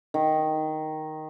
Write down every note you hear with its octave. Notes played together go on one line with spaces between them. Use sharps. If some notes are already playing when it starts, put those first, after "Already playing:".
D#3